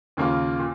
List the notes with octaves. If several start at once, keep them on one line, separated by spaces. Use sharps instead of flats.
D#2 C#3 A#3 F4
A#2